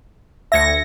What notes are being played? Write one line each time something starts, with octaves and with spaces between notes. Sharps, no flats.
D2 E5 G#6 A#6 C#7